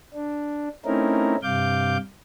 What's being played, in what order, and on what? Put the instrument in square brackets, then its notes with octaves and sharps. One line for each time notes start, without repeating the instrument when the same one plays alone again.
[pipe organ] D4
A3 C4 C#4 D#4 E4 A#4
G2 C3 F5 D6 G6